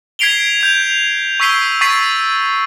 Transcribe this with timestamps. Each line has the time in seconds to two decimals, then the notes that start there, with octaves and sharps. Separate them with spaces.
0.19 G#6 B6 C7 D7 F7 G7
0.61 G6 F7
1.40 C#6 E6 B6 C7 D#7 G7
1.81 C#6 E6 A6 B6 C7 D#7